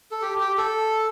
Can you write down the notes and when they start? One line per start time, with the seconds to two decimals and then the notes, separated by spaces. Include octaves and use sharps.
0.11 A4
0.22 G4
0.40 G4
0.58 A4